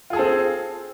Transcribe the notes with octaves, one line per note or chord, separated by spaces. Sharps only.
C4 F4 G#4 A4